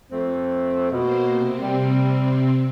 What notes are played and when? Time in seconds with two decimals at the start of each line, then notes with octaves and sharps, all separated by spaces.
0.11 F2 A3 C4
0.91 B2 A#3 C5
1.29 C3 C4
1.60 G3